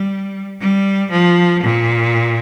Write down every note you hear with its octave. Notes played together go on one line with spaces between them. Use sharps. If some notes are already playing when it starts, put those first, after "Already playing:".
Already playing: G3
G3
F3
A#2